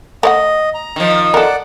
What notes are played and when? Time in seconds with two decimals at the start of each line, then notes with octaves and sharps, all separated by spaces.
0.23 A3 C#5 D#5 F#5
0.74 A#5
0.96 D#3 F3
1.34 A4 A#4 D5 F#5